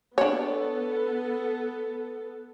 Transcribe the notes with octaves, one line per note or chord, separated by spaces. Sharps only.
B3 D4 A4 C#5